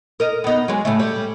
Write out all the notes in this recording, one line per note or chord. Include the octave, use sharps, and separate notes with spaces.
A#4 D#5
B3 D#4
F#3 G#3
A2 C#3 A3
G3 C#5